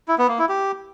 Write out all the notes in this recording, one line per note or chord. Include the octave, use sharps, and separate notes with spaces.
E4
B3
A#3
E4
G4